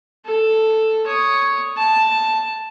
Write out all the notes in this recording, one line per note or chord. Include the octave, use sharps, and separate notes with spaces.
A4
C#5 D#6
A5